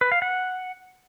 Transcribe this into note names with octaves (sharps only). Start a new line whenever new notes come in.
B4
F5
F#5